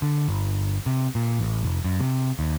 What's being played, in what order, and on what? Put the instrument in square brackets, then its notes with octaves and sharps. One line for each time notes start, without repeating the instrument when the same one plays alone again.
[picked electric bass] D3
G1
C3
A#2
A1
F1
F#2
C3
D#2